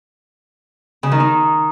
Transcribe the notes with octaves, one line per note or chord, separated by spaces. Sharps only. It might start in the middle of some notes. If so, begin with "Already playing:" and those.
C#3
D#3
D#4